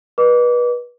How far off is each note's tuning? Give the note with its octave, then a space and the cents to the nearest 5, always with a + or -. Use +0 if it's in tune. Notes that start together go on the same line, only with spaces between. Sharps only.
B4 -25 D#5 -45 D6 -30